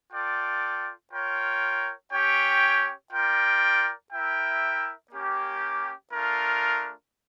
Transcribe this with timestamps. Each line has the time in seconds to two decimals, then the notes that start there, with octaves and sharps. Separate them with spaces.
0.12 F4 A4 D5 G5
1.12 F4 A#4 C#5 G5
2.12 C#4 G4 C#5 G5
3.12 F4 A#4 D5 G5
4.12 E4 A#4 E5 G5
5.12 A#3 C#4 G4
6.12 A3 D4 F4 A#4